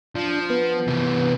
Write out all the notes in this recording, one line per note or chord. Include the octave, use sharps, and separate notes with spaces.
F3 D4
B3
C3 E3